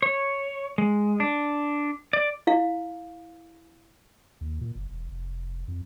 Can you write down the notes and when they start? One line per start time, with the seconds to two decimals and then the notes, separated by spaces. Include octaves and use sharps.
0.02 C#5
0.78 G#3
1.20 D4
2.13 D5
2.47 E4 F5
4.41 D#2
4.61 A#2
4.75 F#1
4.91 E1
5.09 F1
5.68 F2